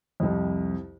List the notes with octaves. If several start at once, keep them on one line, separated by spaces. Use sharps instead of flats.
C2 F2